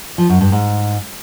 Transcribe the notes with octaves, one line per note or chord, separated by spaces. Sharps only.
F3
F#2
G2
G#2